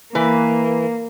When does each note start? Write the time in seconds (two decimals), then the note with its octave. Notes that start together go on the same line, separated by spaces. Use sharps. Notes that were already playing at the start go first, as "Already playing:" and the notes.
0.15 E3 A#3 B4